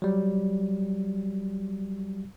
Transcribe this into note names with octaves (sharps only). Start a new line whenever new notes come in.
F#3 G3